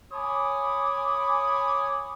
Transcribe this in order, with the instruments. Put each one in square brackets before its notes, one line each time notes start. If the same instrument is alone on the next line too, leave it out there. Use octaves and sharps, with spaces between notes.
[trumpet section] C#5 G#5 B5 D6 D#6